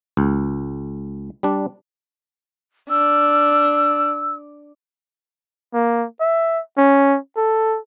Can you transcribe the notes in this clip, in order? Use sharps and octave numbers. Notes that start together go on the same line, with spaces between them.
C#2
G3 D4
D4 E6
A#3
E5
C#4
A4